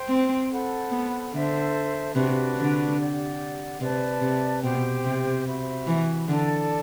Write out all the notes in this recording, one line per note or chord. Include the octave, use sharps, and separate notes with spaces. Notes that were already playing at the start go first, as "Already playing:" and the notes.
Already playing: C5 G5 C6
C4
A4 C5 F#5 B5
B3
D3 A4 C5 E5
C3 D4 F#4 B4
D3
G4 D5 F#5
C3 B4 D5 A5
C3
B2 G4 C5 G5
C3
F#4 C5 E5 B5
E3
D3 A4 D5 A5